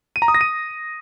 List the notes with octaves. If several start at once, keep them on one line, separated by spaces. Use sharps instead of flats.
D#7
A#5
D#6
A#6
D#7